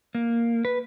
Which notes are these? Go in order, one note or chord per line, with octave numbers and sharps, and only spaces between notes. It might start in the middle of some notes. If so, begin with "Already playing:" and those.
A#3
B4